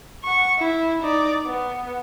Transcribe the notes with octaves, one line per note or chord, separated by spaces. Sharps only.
F#5 C#6
E4
D#4 D5
B3